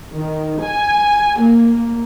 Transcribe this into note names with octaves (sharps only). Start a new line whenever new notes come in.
D#3
G#5
A#3